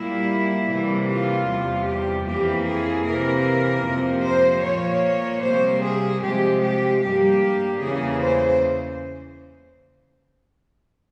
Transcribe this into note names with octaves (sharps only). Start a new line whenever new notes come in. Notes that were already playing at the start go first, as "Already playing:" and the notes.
Already playing: A#2 G3 A#3 E4
C3 E3 G3 A#3
F4
E2 C3 G3
G4
F2 E3 A#3 G4
G#4
C3 E3 A#3 A#4
F2 C3 F3 A#3
C5
A#2 F3 A#3 C#5
C3 G3 A#3 C5
G#4
C3 F3 G#3 G4
G4
G2 G3 A#3 G4
E2 C#3 E3 A#3 G#4
C5